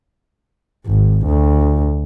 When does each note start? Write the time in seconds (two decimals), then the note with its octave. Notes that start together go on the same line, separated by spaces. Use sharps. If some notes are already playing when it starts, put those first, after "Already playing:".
0.87 G#1
1.27 D2